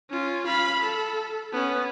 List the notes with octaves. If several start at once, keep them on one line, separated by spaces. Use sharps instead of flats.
C#4 F4
F5 B5
A4
B3 C#4